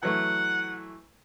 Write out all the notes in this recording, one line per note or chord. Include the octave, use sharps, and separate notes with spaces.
E3 F#3 A3 F#5